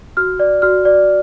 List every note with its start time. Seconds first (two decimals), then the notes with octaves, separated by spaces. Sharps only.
0.17 F#4 F6
0.40 D5
0.62 F#4 F6
0.85 D5